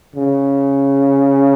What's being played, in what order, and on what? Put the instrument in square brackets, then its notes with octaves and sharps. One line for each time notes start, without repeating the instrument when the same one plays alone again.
[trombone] C#3